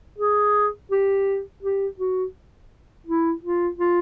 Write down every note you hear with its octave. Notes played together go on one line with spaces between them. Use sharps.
G#4
G4
G4
F#4
E4
F4
F4